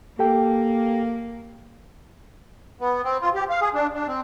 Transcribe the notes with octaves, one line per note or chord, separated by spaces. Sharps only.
A#3 G4 A4 G5
B3
C4
F4
G4
F5
G#4
D4
D4
C4